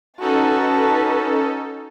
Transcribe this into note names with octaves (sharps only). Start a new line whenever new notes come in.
C#4 D#4 F#4 A4 B4 A5